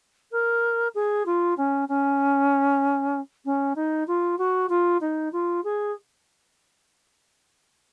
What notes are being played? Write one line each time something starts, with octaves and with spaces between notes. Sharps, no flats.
A#4
G#4
F4
C#4
C#4
C#4
D#4
F4
F#4
F4
D#4
F4
G#4